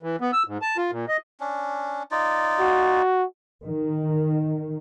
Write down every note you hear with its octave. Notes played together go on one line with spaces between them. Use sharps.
E3
B3
E6
G#2
A5
F4
A#2
D#5
C#4 D4
D#4 F4 D5
F#4
D#3